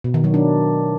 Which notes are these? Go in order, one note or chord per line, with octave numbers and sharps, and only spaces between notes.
B2
D#3
F#3
D4